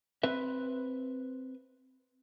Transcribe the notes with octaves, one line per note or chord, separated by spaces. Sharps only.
C4 B4 E5